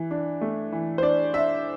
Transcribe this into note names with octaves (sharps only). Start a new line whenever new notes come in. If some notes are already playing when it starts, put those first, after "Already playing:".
Already playing: E3
D4
A3
E3
C5
D4 D5
D4 E5